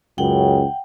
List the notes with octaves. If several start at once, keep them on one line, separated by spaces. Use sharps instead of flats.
C#2 F#2 C#3 F#5 G5